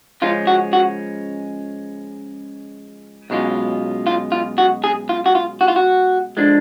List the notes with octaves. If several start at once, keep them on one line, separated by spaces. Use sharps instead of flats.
C#3 F3 G#3 C#4 F4
F#4
F#4
B1 B2 G#3 C#4 F4
F4
F4
F#4
G#4
F4
F#4
F4
F#4
F4
F#4
D3 F3 G#3 D4